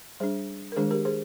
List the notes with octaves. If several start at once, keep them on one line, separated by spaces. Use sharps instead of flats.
G3 D4 G#4 C5
A#4
D#3 G#3 D4 G#4 C5
G4 A#4
G#4 C5